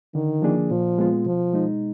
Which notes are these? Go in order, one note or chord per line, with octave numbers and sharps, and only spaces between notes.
D3 D#3
F3 A#3 D4 G#4
A#2 F3
G#3 B3 F4
B2 F3
G#3 D#4